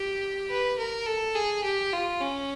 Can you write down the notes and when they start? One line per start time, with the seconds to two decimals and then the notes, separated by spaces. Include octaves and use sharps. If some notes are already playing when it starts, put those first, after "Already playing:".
Already playing: G4
0.50 B4
0.78 A#4
1.06 A4
1.35 G#4
1.64 G4
1.92 F4
2.21 C#4